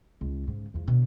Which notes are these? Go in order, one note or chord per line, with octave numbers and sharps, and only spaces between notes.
C#2
G#2 C#3
E2 F3
B2 D3